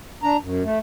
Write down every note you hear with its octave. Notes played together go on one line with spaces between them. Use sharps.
D4 A#5
F#2
A3